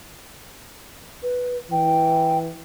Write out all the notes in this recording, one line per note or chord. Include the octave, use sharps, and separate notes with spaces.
B4
E3 G5